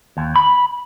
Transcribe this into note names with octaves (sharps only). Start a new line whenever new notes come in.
D#2
B5